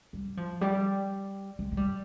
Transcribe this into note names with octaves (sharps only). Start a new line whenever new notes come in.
G3
F3
G3
G#3
G#3
G3